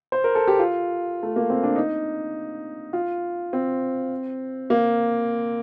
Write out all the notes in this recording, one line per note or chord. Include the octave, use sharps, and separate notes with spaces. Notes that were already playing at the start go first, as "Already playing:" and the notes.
C5
A#4
A4
G4
F4
A3
A#3
C4
D4
D#4
F4
C4
A#3